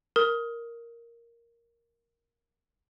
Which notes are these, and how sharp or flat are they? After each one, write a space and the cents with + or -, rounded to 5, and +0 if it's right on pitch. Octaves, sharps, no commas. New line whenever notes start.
A#4 +0 D#6 +20